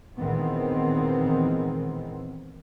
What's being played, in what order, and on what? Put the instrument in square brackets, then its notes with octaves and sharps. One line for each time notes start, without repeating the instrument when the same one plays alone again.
[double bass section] A#2 D#3 E3 G#3 B3 C4